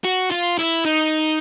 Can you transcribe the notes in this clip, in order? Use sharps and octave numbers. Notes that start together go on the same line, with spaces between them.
F#4
F4
E4
D#4